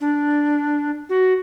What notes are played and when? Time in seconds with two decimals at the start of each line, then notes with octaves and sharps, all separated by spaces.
0.01 D4
1.09 F#4